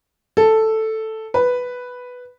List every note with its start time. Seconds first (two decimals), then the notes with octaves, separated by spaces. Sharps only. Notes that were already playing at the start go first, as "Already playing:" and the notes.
0.37 A4
1.34 B4